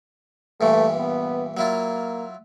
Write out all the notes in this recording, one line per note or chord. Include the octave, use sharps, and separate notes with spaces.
G2 A#2 E3 A3
B3
F#3 A#3 E4 F4